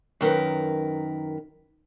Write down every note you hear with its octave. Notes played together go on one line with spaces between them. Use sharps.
F#2 D#3 A#4 B4